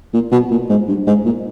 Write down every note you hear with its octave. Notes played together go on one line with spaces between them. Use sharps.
A#2
B2
A#2
G#2
G2
G#2
A#2